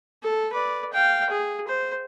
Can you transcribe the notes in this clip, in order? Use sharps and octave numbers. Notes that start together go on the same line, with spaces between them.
A4
B4 D5
F5 G5
G#4
C5